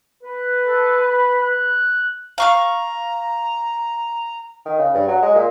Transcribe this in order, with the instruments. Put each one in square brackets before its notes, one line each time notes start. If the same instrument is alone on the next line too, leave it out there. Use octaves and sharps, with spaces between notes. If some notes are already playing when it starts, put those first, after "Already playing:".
[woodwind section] B4
[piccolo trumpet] A4
B5
F#6
[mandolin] F5 C#6 F6 [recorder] A#5
[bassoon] D#3
C#3
G2
F#3
G#3
A#2